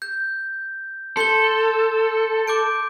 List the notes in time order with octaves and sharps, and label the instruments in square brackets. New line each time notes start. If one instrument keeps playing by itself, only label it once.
[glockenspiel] G6
[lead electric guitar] A4 [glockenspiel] C6 G6 G7
[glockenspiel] D6 G6 D7